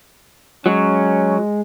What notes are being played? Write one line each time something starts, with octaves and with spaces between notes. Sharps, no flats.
F#3 G#3 C#4